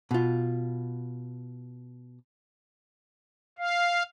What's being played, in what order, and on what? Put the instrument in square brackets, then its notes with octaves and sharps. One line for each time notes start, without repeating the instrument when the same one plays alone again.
[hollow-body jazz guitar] B2 F4
[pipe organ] F5